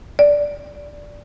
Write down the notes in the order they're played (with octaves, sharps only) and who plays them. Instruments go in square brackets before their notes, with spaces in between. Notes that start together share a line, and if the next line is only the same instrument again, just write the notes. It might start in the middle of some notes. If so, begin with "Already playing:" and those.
[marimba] D5